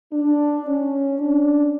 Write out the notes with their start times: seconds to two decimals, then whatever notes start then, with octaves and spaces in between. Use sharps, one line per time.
0.12 D4
0.66 C#4
1.19 D4